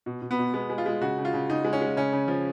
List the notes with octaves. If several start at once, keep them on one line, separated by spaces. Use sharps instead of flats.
B2
B2
B3
B2
G#3 B3
G#3
F4
G#3
C#3 F#4
C#3
F4
C#3
C#3 D#4
G#3
C#4
G#3
C#3 C#4
C#3
F3